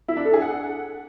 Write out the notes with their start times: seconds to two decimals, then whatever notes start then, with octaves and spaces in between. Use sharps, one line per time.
0.08 E4
0.17 D4
0.25 A4
0.33 G#4
0.42 F#5